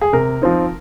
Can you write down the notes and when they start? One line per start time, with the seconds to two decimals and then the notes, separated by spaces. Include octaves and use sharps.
0.02 G#4
0.13 C3 A#4
0.41 F3 C4 D#4